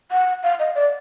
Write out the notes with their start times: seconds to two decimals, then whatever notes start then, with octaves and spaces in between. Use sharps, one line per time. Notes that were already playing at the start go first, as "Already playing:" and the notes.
0.12 F#5
0.43 F5
0.60 D#5
0.75 D5